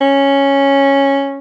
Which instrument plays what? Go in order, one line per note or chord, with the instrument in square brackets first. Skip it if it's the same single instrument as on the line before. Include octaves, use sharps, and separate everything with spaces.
[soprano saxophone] C#4